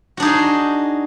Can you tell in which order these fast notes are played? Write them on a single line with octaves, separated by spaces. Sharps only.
F#4 D4 D#4 G#4